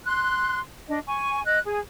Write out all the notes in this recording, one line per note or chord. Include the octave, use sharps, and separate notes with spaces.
C6 F#6
D4 D#5
G#5 C#6
D#5 F#6
G#4